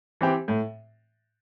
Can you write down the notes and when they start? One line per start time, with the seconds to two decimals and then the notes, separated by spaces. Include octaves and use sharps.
0.21 E3 C4 G4
0.48 A2